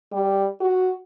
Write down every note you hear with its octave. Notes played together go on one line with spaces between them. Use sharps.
G3
F#4